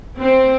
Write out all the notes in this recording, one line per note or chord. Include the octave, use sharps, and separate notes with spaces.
C4